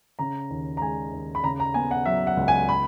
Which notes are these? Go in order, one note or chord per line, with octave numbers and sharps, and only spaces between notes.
C#3 A#5
D#2
A#5
G#3 G#5
D#2
B5
C#3 A#5
A#5
B3 G#5
F#5
F#3 E5
F#5
C#2
G#5
B5